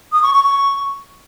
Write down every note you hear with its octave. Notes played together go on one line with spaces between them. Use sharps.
D#6
C#6
C#6
C#6